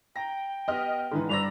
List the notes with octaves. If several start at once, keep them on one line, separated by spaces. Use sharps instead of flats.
G5 A#5 A#6
B3 G4 D#5 F6
G#2 D3 E3 D#4 B4
G2 B4 D5 A#5 E6 A#6 F7